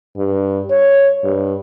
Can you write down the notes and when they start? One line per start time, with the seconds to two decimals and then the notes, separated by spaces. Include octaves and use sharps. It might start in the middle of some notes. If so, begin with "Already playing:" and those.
0.17 G2
0.71 C#5
1.24 G2